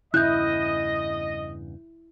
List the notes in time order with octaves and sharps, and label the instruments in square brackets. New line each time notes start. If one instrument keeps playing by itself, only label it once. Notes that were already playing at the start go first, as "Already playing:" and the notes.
[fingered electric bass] E2 G2 C#3 [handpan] E4 [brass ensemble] D#5 [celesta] F#6 G6